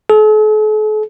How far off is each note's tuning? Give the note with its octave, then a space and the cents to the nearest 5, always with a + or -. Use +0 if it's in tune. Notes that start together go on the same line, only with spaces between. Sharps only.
A4 -45